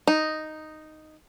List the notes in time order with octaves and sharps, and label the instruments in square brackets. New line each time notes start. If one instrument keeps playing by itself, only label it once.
[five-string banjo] D#4